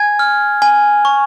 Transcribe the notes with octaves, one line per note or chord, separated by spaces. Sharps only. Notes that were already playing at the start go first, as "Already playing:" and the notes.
Already playing: G#5 G#6
F6
G#5
C#6